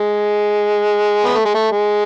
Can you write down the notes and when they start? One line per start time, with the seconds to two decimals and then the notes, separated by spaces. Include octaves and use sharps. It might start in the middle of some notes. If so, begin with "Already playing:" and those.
Already playing: G#3
1.25 B3
1.34 A3
1.45 G#3
1.54 A3
1.71 G#3